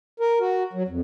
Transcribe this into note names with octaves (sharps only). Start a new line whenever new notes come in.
A#4
F#4
F#3
F2